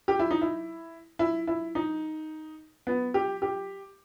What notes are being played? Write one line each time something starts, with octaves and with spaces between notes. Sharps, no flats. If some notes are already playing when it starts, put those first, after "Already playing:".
G4
E4
D#4
E4
E4
E4
D#4
B3
G4
G4